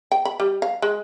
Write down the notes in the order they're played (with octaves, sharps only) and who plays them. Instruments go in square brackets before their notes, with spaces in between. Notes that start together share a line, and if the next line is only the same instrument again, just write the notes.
[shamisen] G5
B5
G3
F5
G#3